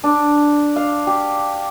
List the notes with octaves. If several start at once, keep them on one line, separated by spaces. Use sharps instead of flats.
D4
F5
G4